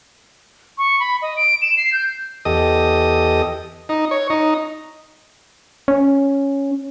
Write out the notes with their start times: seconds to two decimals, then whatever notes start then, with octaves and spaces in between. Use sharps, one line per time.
0.78 C#6
1.00 B5
1.22 D#5
1.37 D7
1.62 E7
1.77 C7
1.93 G6
2.45 E2 G4 A4 D#5 D#6
3.89 D#4
4.11 C#5
4.30 D#4
5.88 C#4